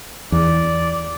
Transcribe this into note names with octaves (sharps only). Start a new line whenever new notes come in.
E2 D5